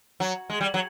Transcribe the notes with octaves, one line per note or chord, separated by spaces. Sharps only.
F#3
G#3
G3
F#3